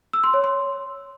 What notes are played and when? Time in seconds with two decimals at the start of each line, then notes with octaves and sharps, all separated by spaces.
0.13 E6
0.24 C6
0.34 C#5
0.44 C6